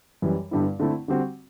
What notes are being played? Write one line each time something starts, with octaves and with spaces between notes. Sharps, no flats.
F#2 E3 G3
G2 D3 G3 B3 E4
D3 A3 C4 E4
D3 G3 C4 F#4